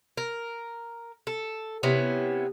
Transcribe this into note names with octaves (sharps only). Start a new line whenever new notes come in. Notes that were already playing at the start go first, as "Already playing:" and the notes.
A#4
A4
C3 B3 C#4 E4